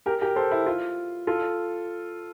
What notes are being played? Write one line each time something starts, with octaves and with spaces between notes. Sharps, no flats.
G4 A#4
G4 A#4
A4 C5
E4
F4
F4 A4